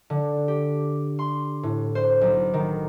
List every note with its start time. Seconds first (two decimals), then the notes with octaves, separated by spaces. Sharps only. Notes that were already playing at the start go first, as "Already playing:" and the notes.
0.10 D3
0.48 G4
1.19 C6
1.63 A2
1.95 C5
2.21 B1
2.54 D#3